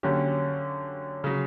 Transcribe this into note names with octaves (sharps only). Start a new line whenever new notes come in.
D3 F#3 A#3 C#4 G4
C#3 F#3